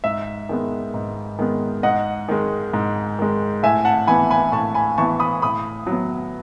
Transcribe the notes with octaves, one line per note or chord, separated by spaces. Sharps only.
G#2 E5
D#3 G#3 B3
G#2
D#3 G#3 B3
G#2 D#5 F#5
D#3 G#3
G#2
D#3 G#3
A2 E5 G#5
F#5 A5
E3 B3 G#5 B5
G#5 B5
A2 A5 C#6
G#5 B5
E3 B3 A5 C#6
B5 D#6
A2 B5 D#6
F#3
B3